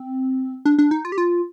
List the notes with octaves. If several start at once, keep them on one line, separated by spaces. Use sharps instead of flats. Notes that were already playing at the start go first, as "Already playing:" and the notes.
Already playing: C4
D4
D4
D#4
F4
G4
F4